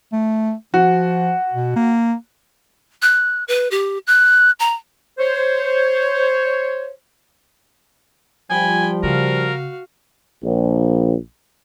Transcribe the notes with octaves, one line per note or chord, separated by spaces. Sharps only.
A3
F3 F#4
B2
A#3
F#6
B4
G4
F#6
A#5
C5 C#5
F3 G3 G5 G#5 B5
C#3 F#4 A#4 F5
A#1